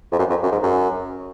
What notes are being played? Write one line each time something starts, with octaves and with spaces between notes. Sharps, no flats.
F2
F#2
F2
F#2
G#2
F#2